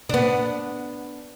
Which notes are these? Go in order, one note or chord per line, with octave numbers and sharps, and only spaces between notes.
B3 D4